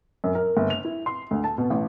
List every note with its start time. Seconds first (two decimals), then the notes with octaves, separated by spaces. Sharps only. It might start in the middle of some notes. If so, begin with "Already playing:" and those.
0.24 F#2
0.35 A#4
0.57 G1
0.70 F7
0.85 E4
1.06 C6
1.31 D2
1.44 A5
1.58 B2
1.70 A1